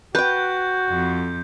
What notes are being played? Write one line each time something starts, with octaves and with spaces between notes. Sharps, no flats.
F#4 B4 G5 G6
F2